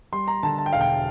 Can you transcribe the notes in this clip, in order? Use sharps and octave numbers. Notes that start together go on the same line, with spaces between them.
G3 C6
A#5
D3 A5
A5
G5
E1 F5
G5